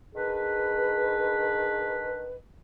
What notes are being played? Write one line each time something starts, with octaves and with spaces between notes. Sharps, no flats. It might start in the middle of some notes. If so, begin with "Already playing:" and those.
D#3 D4 G#4 B4